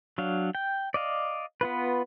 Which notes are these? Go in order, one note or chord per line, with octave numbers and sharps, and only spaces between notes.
F#3 D4 F5
G5
D5 D#5 F5
B3 F4 B4